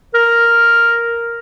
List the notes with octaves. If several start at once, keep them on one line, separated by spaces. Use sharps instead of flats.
A#4